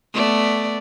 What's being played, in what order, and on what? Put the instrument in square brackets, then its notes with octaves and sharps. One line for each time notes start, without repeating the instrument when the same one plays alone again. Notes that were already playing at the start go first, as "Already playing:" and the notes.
[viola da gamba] A3 B3 D5